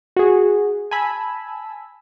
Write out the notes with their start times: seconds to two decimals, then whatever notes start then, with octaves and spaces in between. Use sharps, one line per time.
0.16 F#4 G#4
0.91 G#5 A5 B5 E6